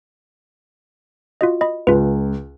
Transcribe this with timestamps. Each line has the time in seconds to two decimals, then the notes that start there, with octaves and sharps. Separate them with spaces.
1.41 F4 F#4 D#5
1.61 D#5 B5
1.87 C#2 F4 B4